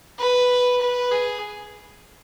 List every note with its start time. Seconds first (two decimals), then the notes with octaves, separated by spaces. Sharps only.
0.19 B4
0.81 B4
1.12 G#4